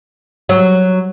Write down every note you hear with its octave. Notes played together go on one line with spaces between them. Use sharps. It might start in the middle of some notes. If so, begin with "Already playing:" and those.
F#3